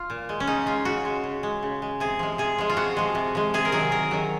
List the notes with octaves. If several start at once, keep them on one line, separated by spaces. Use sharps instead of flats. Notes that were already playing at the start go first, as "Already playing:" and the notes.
Already playing: F4
A#2
G#3
C#4
C#3 D#4
G#3 F4
C#3 F#4
G#3
C#3
G#3
C#3
G#3
C3 G#4
F3 G#3
C3 G#4
F3 G#3
F4
C3 F#4
F3 G#3
C3
F3 G#3
C3 G#4
A#4
D#3 F#3 G#4
C3 A#4
D#3 F#3